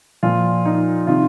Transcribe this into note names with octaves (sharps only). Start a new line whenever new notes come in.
A#2 F3 F4
D#4
C3 D#3 F4